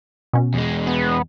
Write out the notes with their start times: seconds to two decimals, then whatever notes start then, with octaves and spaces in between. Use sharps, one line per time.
0.33 B2 C#4
0.54 E2 G#3
0.87 B3